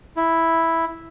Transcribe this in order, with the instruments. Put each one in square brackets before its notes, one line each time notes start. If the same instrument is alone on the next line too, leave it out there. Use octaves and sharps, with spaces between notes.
[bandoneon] E4